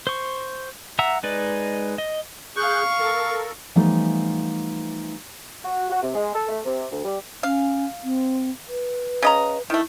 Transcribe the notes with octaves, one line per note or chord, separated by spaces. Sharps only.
C5 C#6
E5 F#5 A#5 E6
G#3 D#4 B4 D5
D#5
G#4 F5 C#6 F#6 G6
A4 A#4
E3 F3 G3 A3 B3 D#4
F#4
F#4
C3
G#3
A4
A3
C3
D2
G3
C#4 F5
C4
B4
C#3 D#5 A#5
D#3 A3 E4